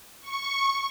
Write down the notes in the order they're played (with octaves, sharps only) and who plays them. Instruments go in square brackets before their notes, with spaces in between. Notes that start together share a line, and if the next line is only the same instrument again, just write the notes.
[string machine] C#6